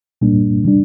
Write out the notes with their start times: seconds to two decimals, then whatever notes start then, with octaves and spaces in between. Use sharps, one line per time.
0.21 C2 A#2 G3 A#3 D4
0.64 C3 G3 D4